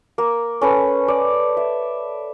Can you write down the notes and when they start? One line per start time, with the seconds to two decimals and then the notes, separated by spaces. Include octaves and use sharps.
0.18 A#3
0.61 C#4 A4 B4
1.08 D5
1.57 E5